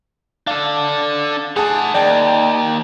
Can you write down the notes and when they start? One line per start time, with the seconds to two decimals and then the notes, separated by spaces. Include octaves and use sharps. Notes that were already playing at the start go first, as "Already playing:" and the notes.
0.47 D4 A4 F5
1.56 G#4 C5 F#5 A5
1.94 D#2 D5 G5 A5